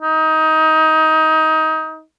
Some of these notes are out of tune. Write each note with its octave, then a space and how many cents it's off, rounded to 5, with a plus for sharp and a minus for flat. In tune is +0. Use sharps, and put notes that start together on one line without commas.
D#4 +20